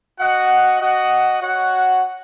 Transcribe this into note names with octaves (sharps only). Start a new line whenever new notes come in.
F#4 D#5 F#5
F#4 D#5 F#5
F#4 C#5 F#5